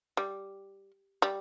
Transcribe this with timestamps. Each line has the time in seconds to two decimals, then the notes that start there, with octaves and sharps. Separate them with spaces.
0.17 G3
1.22 G3